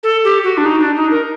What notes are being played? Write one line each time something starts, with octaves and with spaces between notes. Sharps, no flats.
A4
G4
F#4
D4
D#4
D4
D#4
A#4